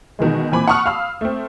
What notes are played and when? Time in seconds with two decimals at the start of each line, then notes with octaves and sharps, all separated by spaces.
0.19 B2 D#3 E3 G#3
0.52 A#2 E3 C4 G#5 B5 D6
0.68 F#5 A5 B5 C#6 D#6 F6
0.86 F5 B5 E6 F6
1.21 A3 C4